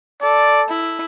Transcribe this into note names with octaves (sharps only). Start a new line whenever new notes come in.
A4 D5
E4